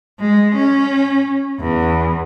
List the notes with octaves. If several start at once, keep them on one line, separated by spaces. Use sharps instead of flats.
G#3
C#4
E2